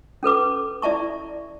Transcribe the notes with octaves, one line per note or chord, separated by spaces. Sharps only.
C#4 A4 B4 D6
E4 D5 E5 A5 C#6